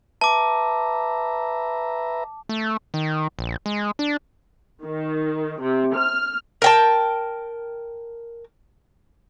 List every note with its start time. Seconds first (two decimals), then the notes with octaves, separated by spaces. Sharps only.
0.21 B4 E5 A5 A#5 D6
2.49 A3
2.94 D#3
3.39 A#1
3.66 G#3
3.99 D4
4.84 D#3
5.62 C3
5.95 F6
6.62 A#4 G5 A5